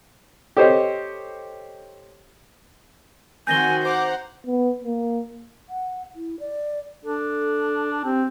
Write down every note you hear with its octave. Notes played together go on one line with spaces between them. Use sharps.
G4 A4 C5 C#5 D#5
D#3 C4 F#4 G#5 G6 A#6 G7
C5 F#5 A#5 D6
B3
A#3
F#5
E4
D5
D4 A4
C4 G4